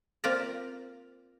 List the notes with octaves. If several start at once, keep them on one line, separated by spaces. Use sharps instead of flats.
A#3 C4 F4 D5 A#5